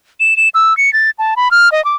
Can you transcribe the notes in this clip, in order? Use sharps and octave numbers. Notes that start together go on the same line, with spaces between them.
E7
E7
E6
C#7
A6
A5
B5
F6
D#5
D6